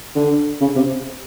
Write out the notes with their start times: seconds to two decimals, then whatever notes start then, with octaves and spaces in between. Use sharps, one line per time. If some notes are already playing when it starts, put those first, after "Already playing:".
0.16 D3
0.61 C#3
0.76 C3